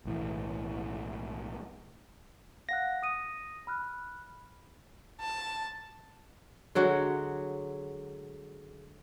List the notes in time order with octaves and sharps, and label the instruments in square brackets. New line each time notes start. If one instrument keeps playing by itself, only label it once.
[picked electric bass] B1 A2 E3
[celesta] F5 F#5 F#6 [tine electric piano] A#6
[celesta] D#6 D#7
B5 F6 F#6
[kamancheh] A5
[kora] D3 F#3 G#3 F#4